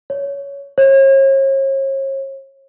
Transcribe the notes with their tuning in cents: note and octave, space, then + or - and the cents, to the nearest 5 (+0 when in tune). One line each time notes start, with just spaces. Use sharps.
C#5 +15
C#5 -40